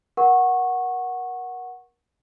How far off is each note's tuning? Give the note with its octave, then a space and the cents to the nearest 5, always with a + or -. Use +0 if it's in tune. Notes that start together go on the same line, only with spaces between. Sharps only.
A#4 +30 F#5 +0 C#6 -15